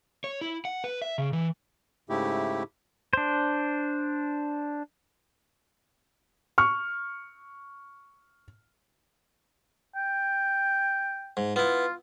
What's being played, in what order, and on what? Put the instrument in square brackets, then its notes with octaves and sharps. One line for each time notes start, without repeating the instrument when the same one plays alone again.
[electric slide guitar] C#5
E4
F#5
B4
E5
C#3
E3
[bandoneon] G#2 C#3 A3 E4 G4
[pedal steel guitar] D4 C5
[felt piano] C#6 F6
[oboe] G5
[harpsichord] G#2
[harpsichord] B3 E4 [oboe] F4